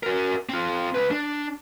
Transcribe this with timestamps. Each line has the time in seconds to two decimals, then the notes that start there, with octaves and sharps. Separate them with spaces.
0.03 F#4 A#4
0.49 C4 F4
0.95 C#2 B4
1.11 D4